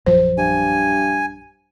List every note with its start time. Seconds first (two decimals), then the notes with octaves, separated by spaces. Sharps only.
0.06 A#1 F#2 F3 C5
0.38 G2 G#5